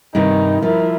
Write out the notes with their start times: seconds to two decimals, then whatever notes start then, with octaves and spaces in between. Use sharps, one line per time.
0.15 G2 C3 D#3 D#4
0.62 F3 E4 A#4